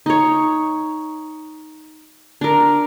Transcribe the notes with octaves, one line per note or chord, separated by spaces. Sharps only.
D#4 C#5
D4 A#4